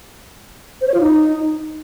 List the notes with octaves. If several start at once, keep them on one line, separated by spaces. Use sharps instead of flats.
C5
C#5
F4
D#4